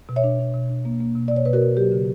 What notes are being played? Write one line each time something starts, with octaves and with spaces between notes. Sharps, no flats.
B2
C#5 E5
D4
D4
B2
D4
A#3
A#3
B2
B2 D5
C#5
B2 B4
F#4 A#4
B2
F#3 G4
C#3